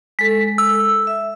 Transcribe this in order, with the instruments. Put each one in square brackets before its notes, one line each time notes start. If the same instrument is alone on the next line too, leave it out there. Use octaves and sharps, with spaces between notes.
[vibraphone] G#3 A4 [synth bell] B6
[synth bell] E6
[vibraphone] E5